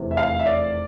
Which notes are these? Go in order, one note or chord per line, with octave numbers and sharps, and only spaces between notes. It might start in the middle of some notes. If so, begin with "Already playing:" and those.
Already playing: F1 E2 C3
E5
F5
E5
D5